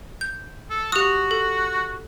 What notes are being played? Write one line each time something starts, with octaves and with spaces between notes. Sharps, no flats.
G6
A4
F#4 G4 D#6
A4